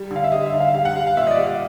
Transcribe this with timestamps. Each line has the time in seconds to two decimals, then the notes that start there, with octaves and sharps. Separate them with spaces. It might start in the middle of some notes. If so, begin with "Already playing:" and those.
Already playing: G3
0.11 D3
0.16 F5
0.24 E5
0.32 G3 D#5
0.46 E5
0.53 D3
0.60 F5
0.74 G3 F5
0.85 F#5
0.95 G3 F5
1.07 F5
1.17 A#2 E5
1.27 D#5
1.31 D5
1.38 G3
1.46 D#5